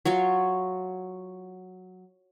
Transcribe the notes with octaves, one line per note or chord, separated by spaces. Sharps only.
F#3 F4 C#5